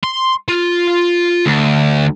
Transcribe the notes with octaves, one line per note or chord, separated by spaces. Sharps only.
C6
F4
D2